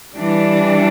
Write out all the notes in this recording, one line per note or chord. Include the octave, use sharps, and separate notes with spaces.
E3 G3 D4